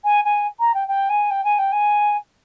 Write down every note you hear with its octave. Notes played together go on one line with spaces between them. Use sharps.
G#5
G#5
A#5
G5
G5
G#5
G5
G#5
G5
G#5